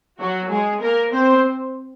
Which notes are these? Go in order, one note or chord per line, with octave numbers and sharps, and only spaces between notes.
F#3 F#4
G#3 G#4
A#3 A#4
C4 C5